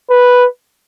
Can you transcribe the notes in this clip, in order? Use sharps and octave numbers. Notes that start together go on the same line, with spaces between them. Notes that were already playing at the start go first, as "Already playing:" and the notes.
B4